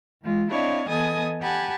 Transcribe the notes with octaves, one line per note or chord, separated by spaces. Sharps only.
E3 G#3 F4
C4 D4 E4 C#5 D#5 F5
E3 B3 A4 D#5 G#5 D#6
G4 F#5 G#5 A5 B5